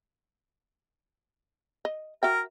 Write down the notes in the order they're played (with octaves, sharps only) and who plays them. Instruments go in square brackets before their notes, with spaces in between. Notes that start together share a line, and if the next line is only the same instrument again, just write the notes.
[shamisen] D#5
[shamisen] F#4 E5 G5 [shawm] A#4